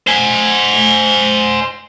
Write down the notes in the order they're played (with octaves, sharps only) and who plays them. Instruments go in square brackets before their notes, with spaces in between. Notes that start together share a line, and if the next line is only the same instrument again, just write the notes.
[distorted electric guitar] C5 G#5